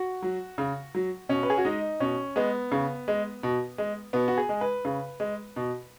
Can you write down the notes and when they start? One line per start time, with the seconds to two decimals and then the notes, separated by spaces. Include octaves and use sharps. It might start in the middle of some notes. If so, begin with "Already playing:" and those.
Already playing: F#4
0.22 F#3
0.58 C#3
0.95 F#3
1.29 B2 C#4
1.43 B4
1.50 G#4
1.58 F#4
1.65 G#3 D#4
2.00 B2 C#4
2.36 G#3 B3
2.72 C#3
3.08 G#3
3.43 B2
3.78 G#3
4.13 B2 B3
4.28 F#4
4.37 G#4
4.49 G#3
4.61 B4
4.85 C#3
5.20 G#3
5.56 B2